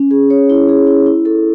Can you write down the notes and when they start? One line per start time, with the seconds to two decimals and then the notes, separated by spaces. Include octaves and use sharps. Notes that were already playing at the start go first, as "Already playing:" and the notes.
Already playing: C#4
0.11 G#4
0.30 C#5
0.49 E4
0.69 G#4
0.87 E4
1.06 E4
1.25 A4